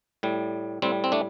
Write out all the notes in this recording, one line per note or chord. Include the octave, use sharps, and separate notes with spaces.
A2 G3
A2 G3 C4
C4
A3 D4